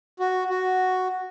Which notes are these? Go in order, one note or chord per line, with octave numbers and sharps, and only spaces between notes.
F#4
F#4